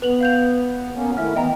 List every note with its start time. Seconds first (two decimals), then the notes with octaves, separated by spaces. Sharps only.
0.02 B3 B4 F7 F#7
0.21 F5 G6 F7
0.95 A#3 B3 C#4
1.17 D#3 A3 E4 E5 F6
1.36 E3 B3 D#5 G5 A#5